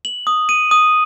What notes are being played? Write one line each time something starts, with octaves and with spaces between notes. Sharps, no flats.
F#7
D#6
D#7
D#6